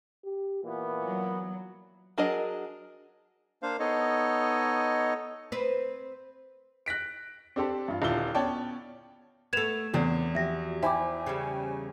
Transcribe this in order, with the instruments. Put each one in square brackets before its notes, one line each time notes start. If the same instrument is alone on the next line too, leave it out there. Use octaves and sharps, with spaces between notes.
[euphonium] G4
[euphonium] A#2 [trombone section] E3 B3
[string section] F#3
[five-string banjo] F#3 D4 G#4 A#4 D#5
[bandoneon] A#3 D4 C5 F5
B3 D#4 A4 C#5 D#5
[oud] C4 B4
[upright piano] F#6 A#6 B6 D7
C4 D4 G4 A4 C5
G2 F4
D#1 D3 E4 F4 G7
B3 C#4 C#5 D5 G5 A5
[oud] A3 B3 [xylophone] G#6 E7 F7
[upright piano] E2 [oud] C4 D4
[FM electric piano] F3 F#4 G4 [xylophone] E5 A#6
[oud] E4 [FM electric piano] C5 G5 G#5 [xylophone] E5 D6
[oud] C#3 G3